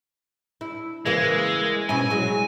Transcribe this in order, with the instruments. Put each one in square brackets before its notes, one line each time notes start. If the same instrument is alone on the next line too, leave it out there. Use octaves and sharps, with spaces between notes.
[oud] E4
[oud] C#3 E3 A#3 [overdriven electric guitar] G#3
[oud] B2 C#4 E4 [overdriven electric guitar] G#5
[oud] F#3 G#3